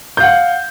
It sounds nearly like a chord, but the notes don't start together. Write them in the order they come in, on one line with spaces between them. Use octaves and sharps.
G6 F5 F#5